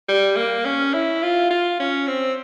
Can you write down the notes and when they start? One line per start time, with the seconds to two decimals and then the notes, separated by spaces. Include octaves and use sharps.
0.09 G3
0.36 A#3
0.65 C#4
0.94 E4
1.23 F4
1.50 F4
1.80 C#4
2.07 C4